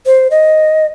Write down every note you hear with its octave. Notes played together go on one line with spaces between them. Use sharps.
C5
D#5